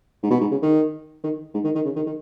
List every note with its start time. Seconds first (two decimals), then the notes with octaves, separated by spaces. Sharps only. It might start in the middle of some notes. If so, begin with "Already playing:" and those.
0.23 G#2
0.30 B2
0.41 G#2
0.51 C#3
0.62 D#3
1.23 D#3
1.54 G#2
1.64 D#3
1.75 D#3
1.85 C#3
1.96 D#3
2.06 D#3